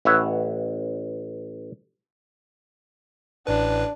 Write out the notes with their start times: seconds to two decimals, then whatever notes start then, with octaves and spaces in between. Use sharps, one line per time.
0.05 A1 B4 C#5 E5 F#5
3.47 A1 A2 D4 B4